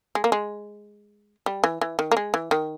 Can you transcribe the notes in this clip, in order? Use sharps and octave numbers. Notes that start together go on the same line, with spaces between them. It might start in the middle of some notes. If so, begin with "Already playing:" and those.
G#3
A#3
G#3
G3
E3
E3
D#3
A#3
G#3
E3
D#3